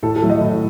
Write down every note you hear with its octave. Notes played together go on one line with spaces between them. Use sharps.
A2 A4
A4
F#3 A3
D#5
A2